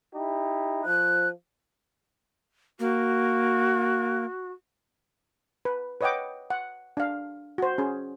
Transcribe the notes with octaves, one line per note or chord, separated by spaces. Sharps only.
D#4 E4 G4
F3 F#6
A#3 F#4
B4
B4 C#5 D#5 F#5 G5 D6
F#5
D4 F5
F#4 C5
C#4 G#4